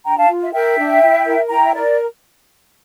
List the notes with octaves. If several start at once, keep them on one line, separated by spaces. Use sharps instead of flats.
D4 G5 A#5
F5 A5
F4
E5
A#4 E5 G5
D4
E4
A#4
E4 G5 A#5
E5
A#4 D5